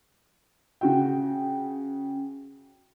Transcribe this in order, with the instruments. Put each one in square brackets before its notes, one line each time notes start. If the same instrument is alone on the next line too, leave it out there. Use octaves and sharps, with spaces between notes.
[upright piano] C#3 F#4 G5